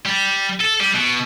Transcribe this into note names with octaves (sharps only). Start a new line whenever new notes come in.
G3
A4
G3
B2